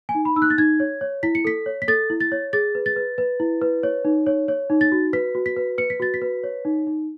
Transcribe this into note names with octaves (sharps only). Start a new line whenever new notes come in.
G#5
D#4
B5
D#4 E6
F#6
A6
D#4 G#6
C#5
C#5
E4 B6
C#7
A4 B6
C#5
B6
A4 A6
E4
A6
C#5
G#4 A6
B4
A6
B4
B4
E4
B4
C#5
D#4
C#5
C#5
D#4
A6
F#4
B4 B6
F#4
B6
B4
B4 C#7
B6
F#4 A6
B6
B4
C#5
D#4
D#4